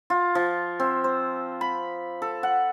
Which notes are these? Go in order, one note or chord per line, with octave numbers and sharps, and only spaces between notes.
F4
F3
C4
C5
B5
A4
F#5